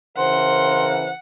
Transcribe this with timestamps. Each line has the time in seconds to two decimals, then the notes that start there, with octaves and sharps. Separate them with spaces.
0.17 C#3 E3 A#4 C5 F#5 C6